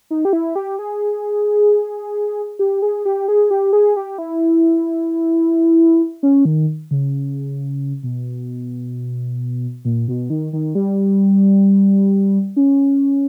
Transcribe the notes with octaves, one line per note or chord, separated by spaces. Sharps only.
D#4
G4
E4
G4
G#4
G4
G#4
G4
G#4
G4
G#4
G4
E4
C#4
D#3
C#3
B2
A#2
B2
D#3
D#3
G3
C#4